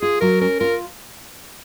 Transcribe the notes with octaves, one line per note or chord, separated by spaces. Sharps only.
F4 G#4
F#3 A#4
C#4 A#4
F4 A#4